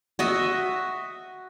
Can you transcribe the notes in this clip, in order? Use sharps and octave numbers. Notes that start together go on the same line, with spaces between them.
F#4 D#5 E5